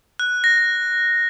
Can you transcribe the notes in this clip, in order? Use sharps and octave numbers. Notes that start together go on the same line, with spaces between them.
F#6
A#6